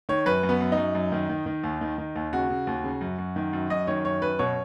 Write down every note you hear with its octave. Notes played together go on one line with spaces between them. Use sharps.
D#3 C#5
F#2 B4
F#2
B3
F#2
D#4
F#2
F#2
D#3
D#3
D#3
D#2
D#3
D#3
D#2
C#3 F#4
C#3
D#2
C#3
F#2
F#2
D#3
F#2
F#2 D#5
D#3 C#5
F#2 C#5
F#2 B4
B2 C#5